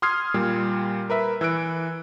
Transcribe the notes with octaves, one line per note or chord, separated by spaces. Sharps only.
C6 D#6 F6 G#6 C7
A#2 G3
A#4 B4 E5
E3 E6 F#6 D7